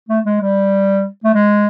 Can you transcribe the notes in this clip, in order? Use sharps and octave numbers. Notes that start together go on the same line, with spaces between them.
A3
G#3
G3
A3
G#3